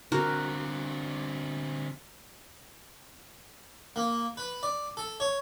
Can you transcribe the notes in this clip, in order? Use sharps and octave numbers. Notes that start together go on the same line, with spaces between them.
D3 C4 F#4 A#4
A#3
B4
D5
A4
C#5